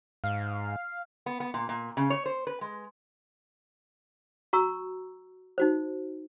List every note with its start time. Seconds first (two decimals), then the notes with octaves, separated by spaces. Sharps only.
0.24 G#2 F5
1.26 B3
1.40 B3
1.54 A#2
1.69 A#2
1.97 C#3
2.10 C#5
2.26 C5
2.47 B4
2.61 G#3
4.53 F#4 A#5 C#6 E6
5.58 D#4 F#4 C5